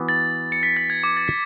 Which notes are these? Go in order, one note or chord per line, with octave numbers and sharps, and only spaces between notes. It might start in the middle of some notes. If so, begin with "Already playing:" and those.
Already playing: E3 B3 F#4
A6
C#7
B6
A6
G#6
D6
A6
B6